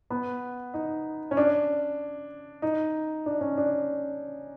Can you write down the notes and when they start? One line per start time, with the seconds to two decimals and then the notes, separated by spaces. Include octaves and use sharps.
0.10 B3
0.74 D#4
1.31 C#4
1.37 D4
2.62 D#4
3.26 D4
3.41 C#4
3.58 D4